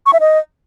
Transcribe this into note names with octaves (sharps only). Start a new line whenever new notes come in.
C#6
E5
D#5